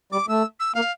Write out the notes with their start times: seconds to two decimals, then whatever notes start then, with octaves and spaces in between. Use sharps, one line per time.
0.12 G3 D6
0.28 A3 E6
0.60 E6
0.75 A#3 F5